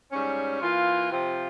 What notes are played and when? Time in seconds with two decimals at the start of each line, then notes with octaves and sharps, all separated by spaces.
0.12 G#2 G3 C#4
0.61 E3 A#3 F4
1.10 C3 F3 C4 F4